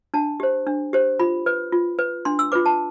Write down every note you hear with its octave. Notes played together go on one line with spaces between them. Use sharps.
D4 A5
G4 C5
D4
G4 C5
F4 B5
B4
F4
B4
D4 C6
E6
F4 B4 D6
A5